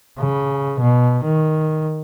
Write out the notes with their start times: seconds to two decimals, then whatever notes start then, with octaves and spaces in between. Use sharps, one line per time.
0.19 C#3
0.80 B2
1.24 D#3